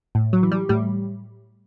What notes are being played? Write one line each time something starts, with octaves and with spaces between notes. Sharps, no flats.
A2
F#3
E3
G3
A2 G3